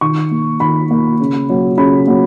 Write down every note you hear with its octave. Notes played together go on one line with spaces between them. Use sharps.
D#3 C#6
A#3
D#3 B5
A#3
C#3
F#3 A#3
C#3 B5
F#3 A#3